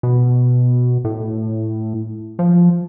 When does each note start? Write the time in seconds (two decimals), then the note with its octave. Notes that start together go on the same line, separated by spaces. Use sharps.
0.03 B2
1.04 A2
2.39 F3